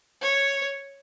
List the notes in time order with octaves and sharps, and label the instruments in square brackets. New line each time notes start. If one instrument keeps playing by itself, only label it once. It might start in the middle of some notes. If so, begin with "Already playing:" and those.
[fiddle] C#5